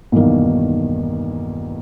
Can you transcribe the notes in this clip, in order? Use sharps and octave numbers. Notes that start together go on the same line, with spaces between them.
B1 E2 G2 D#3 A#3